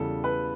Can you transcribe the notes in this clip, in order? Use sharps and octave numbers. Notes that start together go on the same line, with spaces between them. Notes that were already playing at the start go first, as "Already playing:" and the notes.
Already playing: E2 C#3 E3 G3 A4
B4